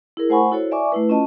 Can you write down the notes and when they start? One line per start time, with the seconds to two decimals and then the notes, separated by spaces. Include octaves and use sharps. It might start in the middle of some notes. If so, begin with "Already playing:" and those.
0.17 E4 G#4 A#4
0.29 A3 C5 F#5 G#5 B5 C#6
0.52 E4 F#4 A4 C5 C#5
0.71 D5 E5 G#5 C#6 D6
0.92 A3 E4 B4
1.09 C#4 F4 D#5 A5